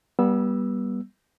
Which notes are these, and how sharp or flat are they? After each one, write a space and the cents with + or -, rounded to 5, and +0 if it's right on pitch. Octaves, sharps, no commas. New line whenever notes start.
G3 +0 B3 -30 E6 +0